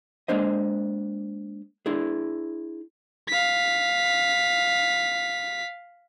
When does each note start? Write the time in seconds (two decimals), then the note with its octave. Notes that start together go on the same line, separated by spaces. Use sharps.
0.28 G#3 A#3 D4 C5 D#5
1.86 D4 E4 G#4
3.29 F5 B6